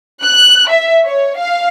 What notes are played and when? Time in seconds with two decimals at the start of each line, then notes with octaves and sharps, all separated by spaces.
0.22 F#6
0.70 E5
1.06 C#5
1.38 F5